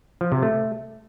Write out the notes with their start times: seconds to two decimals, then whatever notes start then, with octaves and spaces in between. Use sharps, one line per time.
0.21 F3
0.32 C3
0.43 A3